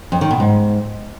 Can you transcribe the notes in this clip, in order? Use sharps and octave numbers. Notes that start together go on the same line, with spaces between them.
F2
D#3
B2
G#2